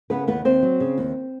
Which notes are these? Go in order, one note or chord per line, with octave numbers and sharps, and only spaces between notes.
C#3 B3 B4
D#2 B3 B4
D#2 C4 C5
F#3
C#3
D#2